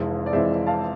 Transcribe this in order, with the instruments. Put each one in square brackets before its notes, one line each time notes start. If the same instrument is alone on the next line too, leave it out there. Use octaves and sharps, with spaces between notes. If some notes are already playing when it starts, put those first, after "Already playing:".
Already playing: [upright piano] F1 F2 E3 G#3
D5
F1 F2 E3 G#3 C5 E5
F5 A5